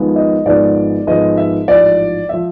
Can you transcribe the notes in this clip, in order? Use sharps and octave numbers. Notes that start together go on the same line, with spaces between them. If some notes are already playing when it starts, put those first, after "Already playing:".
Already playing: G#1 G#2 F3 G#3 B3
D#5
G#1 G#2 F3 G#3 B3 D5
G#1 G#2 F3 G#3 B3 D#5
E5
A1 G#2 F3 D5
F3 E5